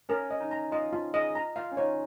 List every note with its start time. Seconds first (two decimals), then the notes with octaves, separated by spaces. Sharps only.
0.09 C#4 A#4
0.31 D#5
0.40 D#4
0.51 A#5
0.72 F4 D#5
0.93 F4
1.14 G#4 D#5
1.35 A#5
1.56 F4 F5
1.72 C#4
1.77 D#4 C#5